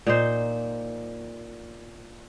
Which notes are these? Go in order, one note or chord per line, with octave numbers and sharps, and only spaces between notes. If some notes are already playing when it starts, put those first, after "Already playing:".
A#2 D#4 C5